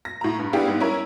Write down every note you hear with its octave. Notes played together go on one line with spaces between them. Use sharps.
A#6
A2 A#5
G2
B3 D4 E4 G4 G#4 F5
G#2 G3 B3
C#4 E4 A#4 A#5